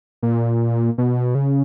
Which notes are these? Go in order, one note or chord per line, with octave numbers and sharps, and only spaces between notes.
A#2
B2
C#3